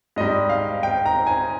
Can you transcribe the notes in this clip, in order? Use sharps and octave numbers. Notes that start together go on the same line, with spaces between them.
G#2 G3 D#5
F5
G5
A#5
G#5